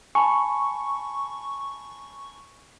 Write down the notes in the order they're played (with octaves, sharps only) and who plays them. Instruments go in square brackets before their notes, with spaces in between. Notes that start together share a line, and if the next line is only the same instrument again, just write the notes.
[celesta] G#5 A5 B5 [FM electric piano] C#6